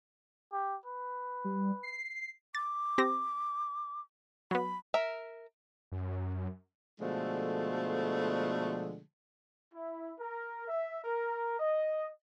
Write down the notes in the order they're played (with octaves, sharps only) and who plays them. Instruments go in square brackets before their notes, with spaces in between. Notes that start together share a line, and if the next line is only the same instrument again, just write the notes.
[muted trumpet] G4
B4
[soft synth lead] G3
C7
[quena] D6 [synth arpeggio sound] A6
[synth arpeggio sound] C4 G4 A#6
[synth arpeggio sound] F#3 B3 [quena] B5
[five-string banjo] A#4 E5
[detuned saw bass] F#2
[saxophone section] B2 D3 F3 G#3 A3
[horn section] E4
A#4
E5
A#4
D#5